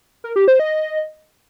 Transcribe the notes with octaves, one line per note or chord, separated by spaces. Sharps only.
A#4
G4
C5
D#5